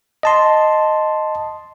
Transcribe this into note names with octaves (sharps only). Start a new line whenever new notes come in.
D#5 A5 C6